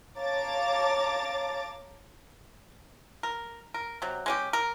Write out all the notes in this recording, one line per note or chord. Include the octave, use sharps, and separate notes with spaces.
C#5 F5 A5 A#5 D6 A6
A#4
A#4
C3 F#3
G#3 C#4 G4
A#4